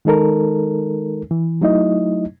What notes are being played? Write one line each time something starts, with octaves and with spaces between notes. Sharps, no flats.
D#3 G#3 D#4 A4 A#4
E3
F#3 A3 D#4 E4 D#5